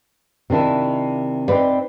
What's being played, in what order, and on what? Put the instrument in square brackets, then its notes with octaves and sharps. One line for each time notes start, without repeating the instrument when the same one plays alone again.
[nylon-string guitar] C3 D#3 D4 E4
C4 D#4 B4 D5